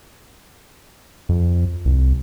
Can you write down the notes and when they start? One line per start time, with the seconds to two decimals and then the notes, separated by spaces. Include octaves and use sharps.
1.29 F2
1.85 C2